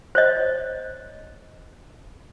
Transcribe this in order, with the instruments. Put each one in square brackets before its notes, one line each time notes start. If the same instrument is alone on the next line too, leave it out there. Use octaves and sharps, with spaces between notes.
[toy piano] C5 C#5 D#5